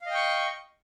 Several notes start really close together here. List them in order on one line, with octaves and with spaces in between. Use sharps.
F5 D#5 G5 C#6